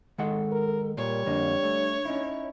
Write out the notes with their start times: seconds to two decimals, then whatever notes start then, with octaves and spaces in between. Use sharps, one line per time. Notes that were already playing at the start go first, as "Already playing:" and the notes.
0.18 D#3 G#3 A4 F#5
0.52 A#4
0.97 A#2 G3 A#4 C#5
1.26 F2 D3 A#3 D4
1.63 A3
2.05 C#4 D#4 E4